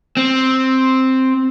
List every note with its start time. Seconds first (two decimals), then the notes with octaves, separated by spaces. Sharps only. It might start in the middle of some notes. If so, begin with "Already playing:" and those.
0.17 C4